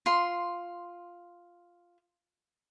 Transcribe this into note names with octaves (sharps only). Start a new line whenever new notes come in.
F4 C6